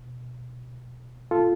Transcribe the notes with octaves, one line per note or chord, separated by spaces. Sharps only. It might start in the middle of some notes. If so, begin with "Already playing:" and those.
Already playing: B2
F4 A4